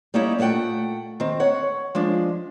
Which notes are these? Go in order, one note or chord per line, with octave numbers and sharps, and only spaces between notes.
G3 A#3 C#4 D#4 E4
A#2 A3 G#4 F#5 G5
D#3 C4
C#5 F#5
F3 G#3 D4